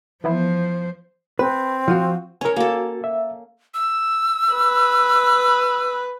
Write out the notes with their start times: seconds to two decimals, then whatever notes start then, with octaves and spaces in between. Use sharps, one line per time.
0.24 E3 F3 B3 E4 C5
1.39 C4 B4
1.88 F3 F4 F#4
2.41 C#4 A#4 C#5 G#5
2.56 A#3 F#4 A4
3.04 E5
3.74 E6
4.52 B4